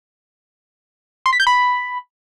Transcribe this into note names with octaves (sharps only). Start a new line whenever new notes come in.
C6
B6
G6
B5